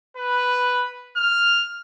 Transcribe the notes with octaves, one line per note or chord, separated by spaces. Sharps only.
B4
F6